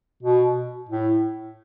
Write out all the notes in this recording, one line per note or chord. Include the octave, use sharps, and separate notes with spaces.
B2
A2